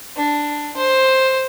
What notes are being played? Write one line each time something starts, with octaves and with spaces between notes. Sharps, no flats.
D4
C5